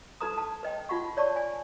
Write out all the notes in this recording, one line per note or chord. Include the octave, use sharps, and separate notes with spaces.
D#4 A4 B4 A#5 D#6
A5
B4 D#5 G5
D#4 F4 F#5 C#6
C#5 D5 A5 C#6
G#5